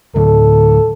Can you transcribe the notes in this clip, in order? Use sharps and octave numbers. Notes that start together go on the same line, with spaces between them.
D2 A2 A4